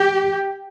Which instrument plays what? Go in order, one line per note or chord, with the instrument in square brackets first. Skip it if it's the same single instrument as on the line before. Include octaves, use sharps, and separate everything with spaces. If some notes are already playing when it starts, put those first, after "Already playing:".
Already playing: [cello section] G4